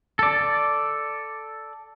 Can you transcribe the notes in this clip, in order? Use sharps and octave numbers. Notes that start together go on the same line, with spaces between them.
A4 D5